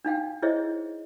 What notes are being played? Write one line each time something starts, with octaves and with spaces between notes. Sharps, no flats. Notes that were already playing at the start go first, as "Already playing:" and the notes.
D4 D#4 F5 G5
E4 G#4 C5 C#5 D#5 E5